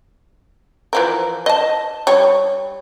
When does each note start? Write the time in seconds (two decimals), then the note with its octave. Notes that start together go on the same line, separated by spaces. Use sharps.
0.93 E3 F3 A#4
1.46 D#5 A5
2.07 G3 C#5